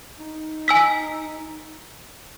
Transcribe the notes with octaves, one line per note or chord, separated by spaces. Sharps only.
D#4
G#5 E6 B6